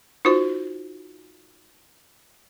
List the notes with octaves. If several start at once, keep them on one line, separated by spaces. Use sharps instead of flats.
D#4 F4 F#4 C5